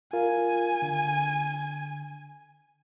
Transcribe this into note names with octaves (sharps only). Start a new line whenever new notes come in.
F4 A#4 F5 G#5
D3